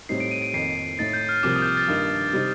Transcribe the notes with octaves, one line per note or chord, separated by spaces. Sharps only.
A2 G3 C4 D#4 C7
D7
D#7
D7
F2 D#3 A#3 C7
A2 A3 D#4 A6
G6
F6
C2 C3 F3 A#3 D6
D#6
G6
F6
A6
G2 D#3 A#3 D#4
C3 G3 C4 D#4